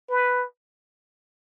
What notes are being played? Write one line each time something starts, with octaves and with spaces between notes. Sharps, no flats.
B4